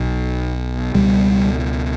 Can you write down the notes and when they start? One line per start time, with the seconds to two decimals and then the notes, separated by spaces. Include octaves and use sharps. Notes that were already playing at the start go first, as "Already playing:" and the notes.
Already playing: B1 B2
0.94 C#2 B2 G3